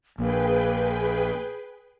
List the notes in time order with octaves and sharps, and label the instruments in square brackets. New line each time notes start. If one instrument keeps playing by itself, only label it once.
[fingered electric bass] A#1 [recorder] A#3 [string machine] G#4 B4 G5